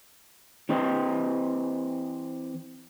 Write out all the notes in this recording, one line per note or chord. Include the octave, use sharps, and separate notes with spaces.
E3 C4 G4 D#5